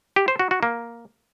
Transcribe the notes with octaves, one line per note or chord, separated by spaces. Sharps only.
G4
C5
F#4
F#4
A#3